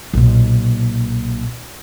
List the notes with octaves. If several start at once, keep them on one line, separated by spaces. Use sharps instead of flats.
B1 A#2